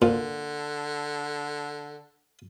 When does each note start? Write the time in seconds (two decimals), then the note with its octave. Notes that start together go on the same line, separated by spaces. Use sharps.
0.02 A#2 D3